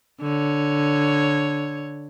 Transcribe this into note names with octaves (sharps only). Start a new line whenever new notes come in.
D3 C#5